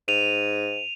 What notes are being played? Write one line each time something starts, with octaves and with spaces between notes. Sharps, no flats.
G#2 D#7 F7